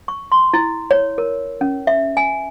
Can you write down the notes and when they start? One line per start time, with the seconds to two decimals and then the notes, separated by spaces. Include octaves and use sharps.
0.08 C#6
0.32 C6
0.54 E4
0.91 C#5
1.18 A#4
1.61 C#4
1.87 E5
2.17 G#5